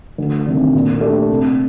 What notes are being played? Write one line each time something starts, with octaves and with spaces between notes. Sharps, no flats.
D2
C3 D#3 G3 D4
A#2
A3 D4 G4
C3